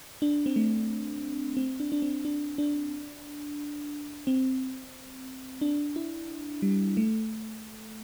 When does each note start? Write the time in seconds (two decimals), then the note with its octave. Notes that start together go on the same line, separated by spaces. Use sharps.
0.22 D4
0.46 C4
0.56 A3
1.57 C4
1.80 D4
1.92 D4
2.02 C4
2.25 D4
2.58 D4
4.27 C4
5.61 D4
5.96 E4
6.62 G3
6.97 A3